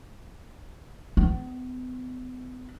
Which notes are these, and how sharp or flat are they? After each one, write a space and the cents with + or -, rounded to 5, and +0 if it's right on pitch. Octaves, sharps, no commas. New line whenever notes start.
B3 +40